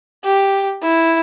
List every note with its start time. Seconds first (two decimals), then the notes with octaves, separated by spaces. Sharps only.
0.24 G4
0.82 E4